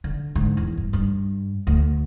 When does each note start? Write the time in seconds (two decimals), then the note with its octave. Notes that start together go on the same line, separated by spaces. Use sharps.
0.04 D3
0.35 G#2 D3
0.57 E2
0.77 G2
0.93 G2
1.67 D2